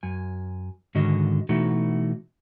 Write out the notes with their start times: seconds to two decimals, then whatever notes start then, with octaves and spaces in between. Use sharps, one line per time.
0.03 F#2 G#5
0.95 G#2 D3 D#3 F#4 D#5
1.49 B2 E3 A3 D#4 F#4